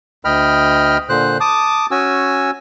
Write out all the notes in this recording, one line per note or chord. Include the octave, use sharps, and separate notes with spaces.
D2 D#5 G5 B5 F6
A#2 D3 C5 F#6
A5 D6 D#6
C#4 F#4 G#5 E6